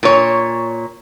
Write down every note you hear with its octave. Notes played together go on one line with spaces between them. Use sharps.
A#2 C#5